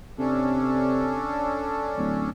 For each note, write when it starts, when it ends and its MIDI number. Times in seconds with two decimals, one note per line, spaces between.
0.19 1.29 48
0.19 2.30 61
0.19 2.30 62
0.19 2.30 69
1.98 2.28 26